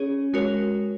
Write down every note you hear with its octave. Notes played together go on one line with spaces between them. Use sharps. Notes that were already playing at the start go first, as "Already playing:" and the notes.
Already playing: C#4 G#4 C#5
G#3 F#4 A#4 C#5